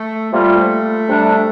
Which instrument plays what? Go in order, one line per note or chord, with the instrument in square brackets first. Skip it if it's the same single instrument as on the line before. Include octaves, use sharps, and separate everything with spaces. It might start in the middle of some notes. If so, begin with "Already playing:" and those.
Already playing: [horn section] A3
[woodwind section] C3 G3 A#3 F4 [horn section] A3
[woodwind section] C3 G3 D4